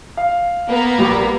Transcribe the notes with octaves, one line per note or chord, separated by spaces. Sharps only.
F5
A#3 B3 A#4
A#1 G3